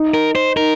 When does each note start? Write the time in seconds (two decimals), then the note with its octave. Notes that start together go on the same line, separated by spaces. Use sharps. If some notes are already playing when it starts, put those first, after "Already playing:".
Already playing: D#4
0.14 A#4
0.35 C5
0.56 D#4 A#4